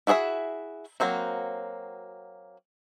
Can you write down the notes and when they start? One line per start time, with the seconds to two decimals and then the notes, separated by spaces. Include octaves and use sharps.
0.07 E4 F#4 G#4 C#5 E5
1.00 F#3 A#3 C4 F#4